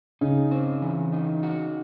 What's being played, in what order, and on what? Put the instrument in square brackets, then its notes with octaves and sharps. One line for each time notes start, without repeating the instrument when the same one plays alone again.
[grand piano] C#3 [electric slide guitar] D#4
[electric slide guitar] C4
E3
D#4
F#4